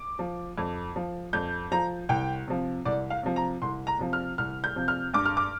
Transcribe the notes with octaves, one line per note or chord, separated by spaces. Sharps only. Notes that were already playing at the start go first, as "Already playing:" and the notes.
Already playing: D6
F3
F2
F3
F2 G6
F3 A#5
C2 G5
C3 F3
C2 D5
F5
C3 F3
A#5
C2 C6
A#5
C3 F3
F6
C2 F6
G6
C3 F3
F6
G2 D6
F6
D6